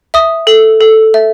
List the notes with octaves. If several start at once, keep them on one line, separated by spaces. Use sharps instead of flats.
E5 D#6
A4
A4
E5